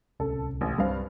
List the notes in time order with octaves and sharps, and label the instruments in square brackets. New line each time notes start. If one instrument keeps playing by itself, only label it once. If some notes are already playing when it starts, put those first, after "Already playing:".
[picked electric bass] D1 C2 C#4 [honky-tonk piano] A4
[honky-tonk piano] A1
[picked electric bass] C2 [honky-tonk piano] G2 C4 F5